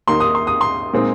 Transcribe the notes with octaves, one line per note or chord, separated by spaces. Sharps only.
D#2 D#3 A#3 D#4 C6
D#6
C6
D#6
C6
A#2 G#3 C4 D#4